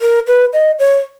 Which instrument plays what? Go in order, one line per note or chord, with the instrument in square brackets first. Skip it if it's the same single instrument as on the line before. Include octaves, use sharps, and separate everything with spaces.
[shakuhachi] A#4
B4
D#5
C#5